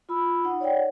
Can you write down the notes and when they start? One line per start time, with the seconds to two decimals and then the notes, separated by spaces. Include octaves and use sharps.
0.09 F4 B5 E6
0.44 D#4 F#5
0.60 C#5 D5 F#5 G5